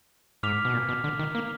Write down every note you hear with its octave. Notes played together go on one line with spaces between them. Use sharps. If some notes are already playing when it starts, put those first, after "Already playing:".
G#2 D6 F6 B6 F7
B2
A#2
B2
D3
D#3
A#3